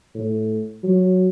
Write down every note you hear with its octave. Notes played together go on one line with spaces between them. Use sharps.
A2
F#3